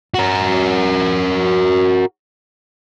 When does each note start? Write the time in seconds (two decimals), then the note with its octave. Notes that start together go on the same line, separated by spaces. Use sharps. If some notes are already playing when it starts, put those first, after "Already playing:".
0.14 F#4 A#4